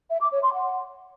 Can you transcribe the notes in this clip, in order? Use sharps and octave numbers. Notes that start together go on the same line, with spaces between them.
E5
D6
C#5
C6
F#5